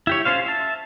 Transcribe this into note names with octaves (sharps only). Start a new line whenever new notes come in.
E4 G4 C#5
C#4 F4 C5 F5
E5 A5